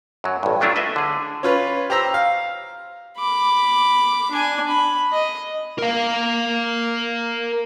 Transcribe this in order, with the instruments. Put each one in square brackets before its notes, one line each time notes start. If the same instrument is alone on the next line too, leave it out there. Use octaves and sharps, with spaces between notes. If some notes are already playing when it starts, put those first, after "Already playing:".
[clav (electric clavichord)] F#2 F#3
A1 G2
F3 F#3 A3 D4 E4 F4
B4 D#5 E5
D3 G#4
[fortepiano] C#4 F4 B4
G4 C5 A#5 E6
F5
[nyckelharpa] B5 D6
D4 G#5
B5
D#5
[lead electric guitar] A#4 F5